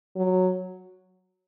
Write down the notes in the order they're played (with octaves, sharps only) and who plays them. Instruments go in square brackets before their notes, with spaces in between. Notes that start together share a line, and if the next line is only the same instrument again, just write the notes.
[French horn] F#3